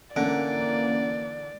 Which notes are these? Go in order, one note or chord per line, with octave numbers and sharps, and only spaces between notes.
D3 E3 A#3 C#4 D5 F#5 D7